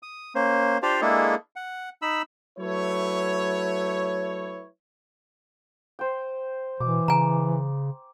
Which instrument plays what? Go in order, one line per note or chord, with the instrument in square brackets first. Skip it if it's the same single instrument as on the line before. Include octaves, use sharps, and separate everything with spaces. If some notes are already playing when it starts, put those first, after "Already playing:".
[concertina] D#6
A#3 C#4 C5
D4 F4 G4 C5 D5 F5
G#3 A#3 D4 E4 G#4 A4
F#5
D#4 B5 E6
[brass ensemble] F#3 A3 E4 B4 C#5
[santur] C5 G5
[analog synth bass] B2 [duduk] E3 [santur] D6
[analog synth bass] C#3 [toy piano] G#5 A#5